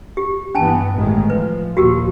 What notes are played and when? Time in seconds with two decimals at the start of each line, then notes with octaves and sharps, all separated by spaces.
0.17 G4
0.55 G2 E3 B3 C#4 G#5 A5
0.95 A1 D#3 G#3
1.30 F3 B4
1.77 D#2 A#2 F3 F#4 G4 A#4